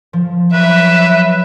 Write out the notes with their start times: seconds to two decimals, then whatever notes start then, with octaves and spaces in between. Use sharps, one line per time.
0.13 F3
0.53 F#3 B4 E5